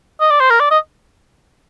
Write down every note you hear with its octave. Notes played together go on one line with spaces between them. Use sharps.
D#5
D5
C5
A#4
D5
D#5